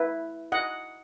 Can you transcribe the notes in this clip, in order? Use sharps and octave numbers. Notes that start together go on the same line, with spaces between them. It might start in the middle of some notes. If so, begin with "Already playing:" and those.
Already playing: E4 B4
D#5 F#5